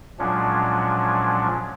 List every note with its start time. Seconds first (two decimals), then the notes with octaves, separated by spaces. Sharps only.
0.19 A#2 F3 F#3 G#3 C#4 D4